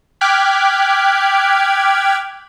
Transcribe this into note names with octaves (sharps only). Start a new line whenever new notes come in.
G5 D6 F6 F#6 G#6 B6